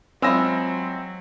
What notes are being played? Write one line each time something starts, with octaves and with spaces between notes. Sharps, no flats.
F#3 G#3 C4 E4 F4 E6 A#6